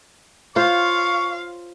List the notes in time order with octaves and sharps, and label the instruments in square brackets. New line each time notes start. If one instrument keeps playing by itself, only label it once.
[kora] F4 C5 C#5 [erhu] F5 [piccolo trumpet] C#6